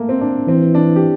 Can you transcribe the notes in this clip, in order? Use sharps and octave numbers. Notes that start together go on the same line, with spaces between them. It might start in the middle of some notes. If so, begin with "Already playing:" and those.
Already playing: A3 A#3
C4
D4
E3 C4
D4
G4